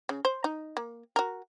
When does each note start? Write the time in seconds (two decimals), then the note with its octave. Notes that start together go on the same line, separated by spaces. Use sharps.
0.09 C#3
0.25 C5
0.44 D#4
0.77 A#3
1.16 F#4 A#4